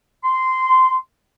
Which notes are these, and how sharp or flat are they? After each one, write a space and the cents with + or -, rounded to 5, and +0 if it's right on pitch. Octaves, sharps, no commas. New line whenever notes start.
C6 -15